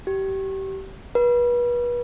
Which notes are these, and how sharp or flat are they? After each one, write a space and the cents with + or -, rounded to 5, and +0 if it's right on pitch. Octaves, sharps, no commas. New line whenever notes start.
G4 -25
B4 -35